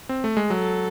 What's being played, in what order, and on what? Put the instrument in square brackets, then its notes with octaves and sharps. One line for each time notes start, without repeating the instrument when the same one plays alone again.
[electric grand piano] C4
A3
G#3
[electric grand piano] F#3 [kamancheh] A4